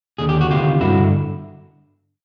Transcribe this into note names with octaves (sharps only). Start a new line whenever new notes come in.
D#2 D3 G#4
G4
F#4
D2 C3 D#3 F4 G4
G2 D3 E4 F#4